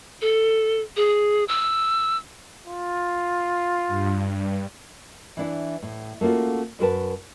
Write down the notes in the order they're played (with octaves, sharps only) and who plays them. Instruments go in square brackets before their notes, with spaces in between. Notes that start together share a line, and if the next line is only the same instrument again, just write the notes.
[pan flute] A4
G#4
E6
[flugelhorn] F4
[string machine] G2
[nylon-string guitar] E3 D4 E4
A2
A3 A#3 C#4 F4 F#4
F#2 F#4 A#4 B4 A5